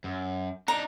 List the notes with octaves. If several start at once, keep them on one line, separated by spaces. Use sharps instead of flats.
F#2
D4 D#4 A#5